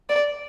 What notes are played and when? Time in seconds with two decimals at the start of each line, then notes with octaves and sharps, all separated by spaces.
0.09 D5